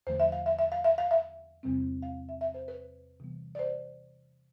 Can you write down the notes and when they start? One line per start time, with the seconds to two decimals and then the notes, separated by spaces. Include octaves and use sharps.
0.07 E2 D3 F3 A3 C5
0.20 E5
0.32 F5
0.46 E5
0.59 E5
0.72 F5
0.84 E5
0.98 F5
1.11 E5
1.63 E2 C3 G3 C4
2.02 F5
2.29 E5
2.41 E5
2.54 C5
2.68 B4
3.20 C3 E3 G3 B3
3.55 D5
3.59 C5